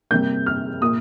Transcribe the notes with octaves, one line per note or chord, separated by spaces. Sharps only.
C3 G3 A#3 G6
F6
A#2 A#3 D#6